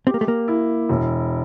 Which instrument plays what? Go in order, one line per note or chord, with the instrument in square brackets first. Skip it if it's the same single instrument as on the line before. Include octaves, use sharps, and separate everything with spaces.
[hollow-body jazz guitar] C4 [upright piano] G4
[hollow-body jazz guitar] A#3
A3
A#3
[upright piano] E4
E1